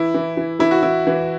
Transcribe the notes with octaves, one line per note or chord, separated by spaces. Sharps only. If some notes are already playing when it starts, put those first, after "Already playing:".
Already playing: E3 E4
E3
E3
E3 E4
F#4
E3 E4
E3